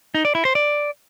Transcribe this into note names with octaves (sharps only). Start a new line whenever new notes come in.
D#4
D5
E4
C5
D5